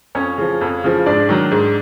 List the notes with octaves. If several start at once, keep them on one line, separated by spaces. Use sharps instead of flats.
F2 C#4 C#5
C#3 F3
F2
C#3 F3
G#2 D4 D5
D#3 F#3
G#2